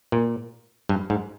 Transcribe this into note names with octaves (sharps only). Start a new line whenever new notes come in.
A#2
G2
G#2